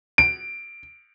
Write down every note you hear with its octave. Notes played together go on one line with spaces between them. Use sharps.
D7